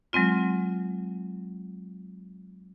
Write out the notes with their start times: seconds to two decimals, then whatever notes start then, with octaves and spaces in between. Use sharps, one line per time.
0.13 F#3 G#3 C4 F4